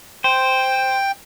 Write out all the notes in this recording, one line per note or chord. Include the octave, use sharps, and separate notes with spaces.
C5 G5